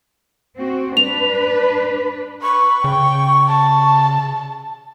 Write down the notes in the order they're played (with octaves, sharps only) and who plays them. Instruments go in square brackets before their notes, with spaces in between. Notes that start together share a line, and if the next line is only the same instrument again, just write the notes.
[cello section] C4 F#4
[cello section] D4 B4 [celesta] F7
[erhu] B4 [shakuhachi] C#6
[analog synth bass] C#3 [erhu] G5
[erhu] A5